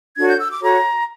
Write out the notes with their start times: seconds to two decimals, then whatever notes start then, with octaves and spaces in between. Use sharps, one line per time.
0.17 D4 F#4 A4 C#5 G#6
0.29 G6
0.39 E6
0.52 D6
0.62 F#4 A4 C#5 A#5